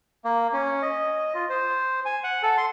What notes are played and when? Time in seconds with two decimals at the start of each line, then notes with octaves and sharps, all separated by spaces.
0.25 A#3
0.53 C#4
0.82 D#5
1.35 F4
1.49 C5
2.05 G#5
2.24 F#5
2.43 A4
2.58 C6